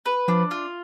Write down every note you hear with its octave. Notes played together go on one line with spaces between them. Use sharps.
B4
F3 D4
F4